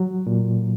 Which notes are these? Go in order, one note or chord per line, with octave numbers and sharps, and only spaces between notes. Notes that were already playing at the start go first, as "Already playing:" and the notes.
Already playing: F#3
A#2